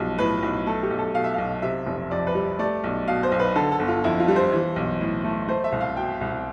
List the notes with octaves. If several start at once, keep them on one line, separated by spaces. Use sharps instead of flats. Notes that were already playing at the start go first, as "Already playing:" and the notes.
Already playing: B1 F3 G3
A2 B4
B1
A3 A4
G4
B1
A4
B2 F5
E5
B1 F5
C3 E5
F1
F2 D5
B4
G3
A3 D5
B1
B2 F5
C5
B1
B4
D3 A4
A4
G1
F4
F2 E4
F4
G3
C5
E3
B1
A2
A3
A3 C5
E5
C2
F5
B2 G5
C2